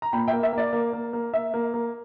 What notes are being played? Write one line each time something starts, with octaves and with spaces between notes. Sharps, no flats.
A#5
A#2 G5 B5
E5 G5
A#3
E5
A#3
D5
A#3
A#3
A#3
A#3 E5
A#3
A#3